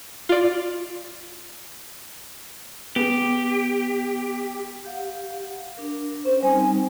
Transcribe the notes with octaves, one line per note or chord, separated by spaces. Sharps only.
F4 D5
B3 G4 G#4
G4 F5 F#5
D4 A#4
C#4 C5
G3 C4 D#4 G#5